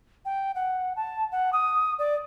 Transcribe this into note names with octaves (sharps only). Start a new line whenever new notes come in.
G5
F#5
A5
F#5
D#6
D5